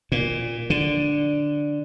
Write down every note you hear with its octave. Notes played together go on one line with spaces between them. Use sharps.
A#2
D3